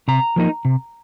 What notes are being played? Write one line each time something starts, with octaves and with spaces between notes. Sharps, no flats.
C3 A#5
F3 A#3 D#4
C3